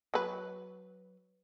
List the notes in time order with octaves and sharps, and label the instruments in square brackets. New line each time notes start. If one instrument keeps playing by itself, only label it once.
[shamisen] F#3 B4